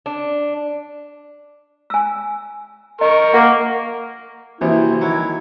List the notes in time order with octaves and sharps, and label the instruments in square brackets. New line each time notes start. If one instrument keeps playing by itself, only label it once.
[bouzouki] D4
[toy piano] G#5 E6
[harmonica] A#4 C#6 [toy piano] D#5
[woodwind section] A#3 [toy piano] F#5
[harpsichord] A#1 C3 [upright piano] E3 [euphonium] E4 [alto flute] F#4
[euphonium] D#3 [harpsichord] F#3 E4